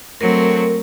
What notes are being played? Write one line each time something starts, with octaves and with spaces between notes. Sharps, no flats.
F#3 A3 C4 A#4